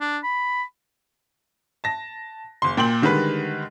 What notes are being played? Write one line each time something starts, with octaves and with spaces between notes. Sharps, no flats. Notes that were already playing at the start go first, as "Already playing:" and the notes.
D4
B5
A5 A#6
F#1 C6
A#2 G5 C6 F#7
D3 D#3 G3 G#3 B4